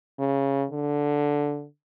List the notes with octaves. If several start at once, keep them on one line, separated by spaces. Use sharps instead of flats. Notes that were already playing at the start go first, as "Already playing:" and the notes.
C#3
D3